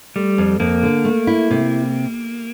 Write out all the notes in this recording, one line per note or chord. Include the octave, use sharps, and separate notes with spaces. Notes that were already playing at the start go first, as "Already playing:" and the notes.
G3 A3
F2
F2 A#3
D3
A3
E4
C3